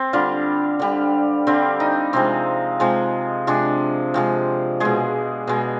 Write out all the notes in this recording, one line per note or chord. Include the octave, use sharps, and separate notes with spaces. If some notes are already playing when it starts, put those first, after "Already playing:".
Already playing: C4
D3 G3 F4
D3 G3
D3 G3 C4
D#4
C3 F3 G#3 C4
C3 F3 G#3
C3 F3 G#3 D4
C3 F3 G#3
B2 G#3 G#4
B2 G#3